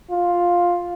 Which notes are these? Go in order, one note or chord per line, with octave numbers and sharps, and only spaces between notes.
F4